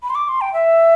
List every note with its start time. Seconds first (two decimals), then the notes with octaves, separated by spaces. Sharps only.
0.03 B5
0.10 C6
0.15 D6
0.28 C6
0.41 G5
0.54 E5